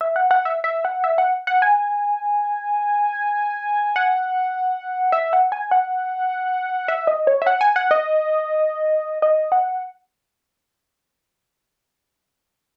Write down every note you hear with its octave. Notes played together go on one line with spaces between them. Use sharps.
E5
F#5
F#5
E5
E5
F#5
E5
F#5
F#5
G#5
F#5
E5
F#5
G#5
F#5
E5
D#5
C#5
E5
F#5
G#5
F#5
D#5
D#5
F#5